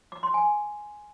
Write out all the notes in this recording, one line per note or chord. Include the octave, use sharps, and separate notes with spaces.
D6
C6
G#5